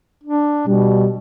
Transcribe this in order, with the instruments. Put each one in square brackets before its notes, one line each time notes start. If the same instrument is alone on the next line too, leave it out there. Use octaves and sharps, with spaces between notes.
[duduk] D4
[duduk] B2 [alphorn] G3